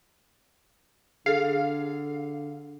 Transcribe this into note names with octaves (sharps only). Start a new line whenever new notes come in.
D3 G#4 A4 F5